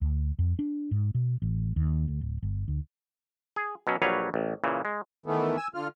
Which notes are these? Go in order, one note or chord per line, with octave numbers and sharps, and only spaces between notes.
D2
F2
D4
G#2
B2
A1
D#2
D2
D1
G1
D2
G#4
B2 F#3 C#4
A#1 F#3 G3 B4 C#5 F5
A1
A#2 C#3 E3
G#3
D#3 E3 A3 B3
G#5 E6
D3 F4 F6